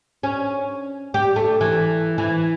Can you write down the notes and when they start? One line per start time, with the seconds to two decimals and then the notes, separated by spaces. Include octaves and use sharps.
0.23 C#4
1.14 G4
1.36 A3
1.61 E3
2.18 E3